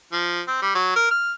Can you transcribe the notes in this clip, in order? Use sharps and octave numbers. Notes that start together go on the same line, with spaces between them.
F3
C4
G3
F#3
A#4
F6